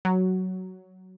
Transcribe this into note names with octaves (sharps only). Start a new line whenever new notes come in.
F#3